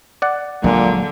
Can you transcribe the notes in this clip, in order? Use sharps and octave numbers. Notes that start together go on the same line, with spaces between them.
D5 F#5
A#1 A#2 D3 F#3 G#3